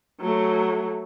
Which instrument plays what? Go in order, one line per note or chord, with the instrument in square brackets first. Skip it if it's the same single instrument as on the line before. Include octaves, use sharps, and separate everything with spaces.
[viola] F#3 A3